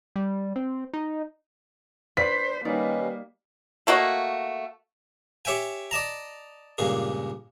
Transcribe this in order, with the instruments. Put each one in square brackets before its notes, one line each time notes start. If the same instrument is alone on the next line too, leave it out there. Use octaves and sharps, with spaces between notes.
[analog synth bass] G3
C4
D#4
[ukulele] D4 B4 D5 [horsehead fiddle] C5 [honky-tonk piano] B6
[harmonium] D#3 C#4 B4 [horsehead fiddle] G3 A#3 [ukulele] D#4 D5
[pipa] A3 A#3 F#4 D#5
[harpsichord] G4 C#5 E5 G5 G#5
D5 D#5 A5 A#5
C#2 G2 A#2 G#4